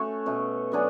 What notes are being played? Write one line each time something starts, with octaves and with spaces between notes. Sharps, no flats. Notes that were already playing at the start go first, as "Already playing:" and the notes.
Already playing: A3 C#4 F#4 C#5
B2 A3 C#4
F#3 B3 D4 G#4